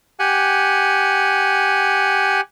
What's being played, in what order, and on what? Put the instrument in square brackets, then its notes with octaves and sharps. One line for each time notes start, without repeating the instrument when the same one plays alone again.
[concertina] G4 F#5 G#5